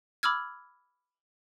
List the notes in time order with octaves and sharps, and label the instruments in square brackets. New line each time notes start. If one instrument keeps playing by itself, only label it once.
[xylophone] B5 D6 E6 F6 G#6